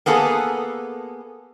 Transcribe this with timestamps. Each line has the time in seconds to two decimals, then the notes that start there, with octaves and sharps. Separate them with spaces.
0.06 A#3 B3 G#4 A4